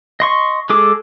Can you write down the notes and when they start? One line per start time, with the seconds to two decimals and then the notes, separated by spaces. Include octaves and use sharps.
0.20 D#5 C6 C#6
0.69 G#3 G#4 A4 D6